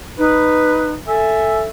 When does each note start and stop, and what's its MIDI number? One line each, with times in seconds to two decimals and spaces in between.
0.18 0.93 63
0.18 0.94 71
1.08 1.67 69
1.08 1.67 76
1.08 1.59 80